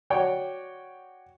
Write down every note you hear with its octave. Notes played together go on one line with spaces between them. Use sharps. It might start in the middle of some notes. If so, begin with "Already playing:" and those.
F#4 C#5 D5 G5